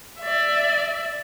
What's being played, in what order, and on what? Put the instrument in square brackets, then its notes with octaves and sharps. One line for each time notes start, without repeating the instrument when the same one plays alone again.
[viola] D5 E5